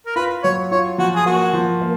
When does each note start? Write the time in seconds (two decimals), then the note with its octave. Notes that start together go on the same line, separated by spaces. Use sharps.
0.07 A#4
0.16 F4 B4
0.44 F#3 C#5
0.71 F4 C#5
0.98 F3 F#4
1.16 G#4
1.26 A#3 F#4
1.53 F3
1.82 A#3